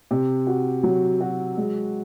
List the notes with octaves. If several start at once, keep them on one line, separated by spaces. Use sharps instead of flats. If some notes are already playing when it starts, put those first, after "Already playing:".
C3
F#4
F#3
F#4
G#3